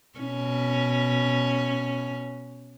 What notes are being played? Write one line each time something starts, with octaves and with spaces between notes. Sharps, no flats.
B2 C#4